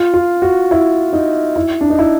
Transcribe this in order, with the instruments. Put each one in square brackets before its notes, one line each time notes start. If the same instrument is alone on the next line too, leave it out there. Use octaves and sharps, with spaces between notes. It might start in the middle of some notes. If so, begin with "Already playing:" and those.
Already playing: [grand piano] F4
F4
F#4
E4
D#4
E4
D4
D#4
E4